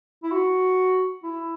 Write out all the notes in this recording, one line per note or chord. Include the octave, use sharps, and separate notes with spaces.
E4
F#4
E4